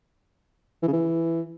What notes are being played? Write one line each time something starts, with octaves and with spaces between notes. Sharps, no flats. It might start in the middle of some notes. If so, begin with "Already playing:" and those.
E3
C#3
E3